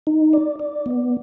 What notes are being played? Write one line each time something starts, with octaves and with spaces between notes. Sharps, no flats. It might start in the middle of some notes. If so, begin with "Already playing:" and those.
D#4
D5
D5
B3